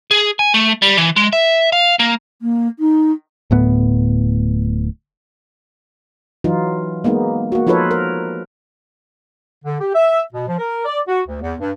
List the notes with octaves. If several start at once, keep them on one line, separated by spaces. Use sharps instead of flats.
G#4
G#5
A3
G3
E3
G#3
E5
F5
A#3
A#3
D#4
D1 A2 B3
E3 F#3 D#4 F4
G#3 A#3 B3 D#4
A#3 F#4
F3 D#4 F4 A4 B4 C#5
A#4
D3
G4
E5
B2
F3
A#4
D5
F#4
D2
E2
G2